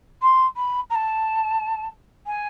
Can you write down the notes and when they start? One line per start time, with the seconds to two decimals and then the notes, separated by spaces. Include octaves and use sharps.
0.22 C6
0.56 B5
0.90 A#5
0.95 A5
2.26 G#5